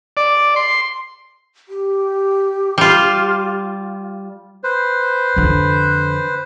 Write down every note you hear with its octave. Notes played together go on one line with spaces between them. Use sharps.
D5
C6
G4
G3 F4
B4 C5
F2 D3